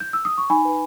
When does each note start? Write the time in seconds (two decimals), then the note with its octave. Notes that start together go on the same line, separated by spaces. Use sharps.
0.00 G6
0.13 E6
0.25 D#6
0.38 C#6
0.50 D#4 G#5 B5
0.65 B4